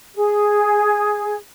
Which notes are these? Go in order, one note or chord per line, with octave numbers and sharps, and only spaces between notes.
G#4